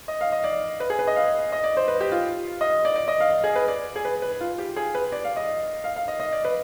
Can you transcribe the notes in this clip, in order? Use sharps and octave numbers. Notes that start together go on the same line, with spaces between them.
D#5
F5
D#5
D5
B4
G#4
B4
D#5
F5
D#5
D5
C5
B4
G4
F4
D#5
D5
D5
D#5
F5
G#4
B4
D5
G#4
B4
B4
F4
G4
G#4
B4
D5
F5
D#5
F5
F5
D#5
D#5
D5
B4